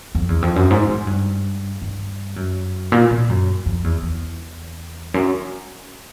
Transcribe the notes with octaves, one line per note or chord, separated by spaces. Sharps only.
F2
E2
F2
F#2
G#2
G#2
G2
G2
F#2
A#2
A#2
F#2
F2
E2
E2
F#2